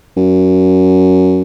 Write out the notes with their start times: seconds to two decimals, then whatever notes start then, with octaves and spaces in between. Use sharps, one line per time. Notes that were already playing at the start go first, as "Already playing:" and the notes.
0.17 F#2